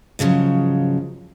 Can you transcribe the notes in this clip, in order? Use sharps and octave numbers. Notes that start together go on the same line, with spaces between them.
G#2 C#3 F3 F#3